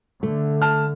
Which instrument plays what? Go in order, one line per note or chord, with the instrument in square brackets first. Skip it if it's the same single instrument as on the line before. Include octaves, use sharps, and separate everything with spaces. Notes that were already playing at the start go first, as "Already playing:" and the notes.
[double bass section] D3 [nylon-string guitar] A3
[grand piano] A5 F6